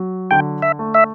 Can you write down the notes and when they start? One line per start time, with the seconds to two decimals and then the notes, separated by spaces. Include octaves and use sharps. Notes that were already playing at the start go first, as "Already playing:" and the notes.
Already playing: F#3
0.31 D3 G5
0.62 E5
0.79 A3
0.94 E5